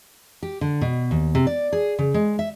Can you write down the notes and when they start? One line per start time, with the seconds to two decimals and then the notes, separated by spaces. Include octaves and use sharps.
0.43 G4
0.61 D3
0.81 B2
1.11 D#2
1.35 C3
1.47 D5
1.73 G#4
1.99 C#3
2.14 G#3
2.39 E5